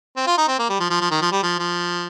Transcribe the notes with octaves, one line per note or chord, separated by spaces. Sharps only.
C4
F4
D#4
C4
A#3
G3
F3
F3
F3
D#3
F3
G3
F3
F3